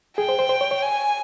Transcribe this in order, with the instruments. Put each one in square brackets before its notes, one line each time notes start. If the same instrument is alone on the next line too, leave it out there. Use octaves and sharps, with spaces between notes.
[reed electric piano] G#4 [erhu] G5
[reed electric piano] C5
C5
C5
C#5
C#5
[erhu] G#5